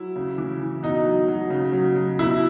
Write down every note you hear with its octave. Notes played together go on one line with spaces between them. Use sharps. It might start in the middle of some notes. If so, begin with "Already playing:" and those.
Already playing: F#3 E4
C#3
E3
E3
B2 D#4
F#3
F#3
C#3
F#3
F#3
B2 E4